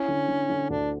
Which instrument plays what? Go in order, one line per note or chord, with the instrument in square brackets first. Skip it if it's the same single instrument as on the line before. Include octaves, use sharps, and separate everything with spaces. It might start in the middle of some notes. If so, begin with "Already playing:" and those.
Already playing: [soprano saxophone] C#4 [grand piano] E4
[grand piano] D3
D3
D3
[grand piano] D2 [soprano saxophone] D4